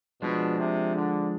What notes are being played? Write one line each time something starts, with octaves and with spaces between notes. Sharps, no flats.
B2 F3 G#3 D4
C3
D3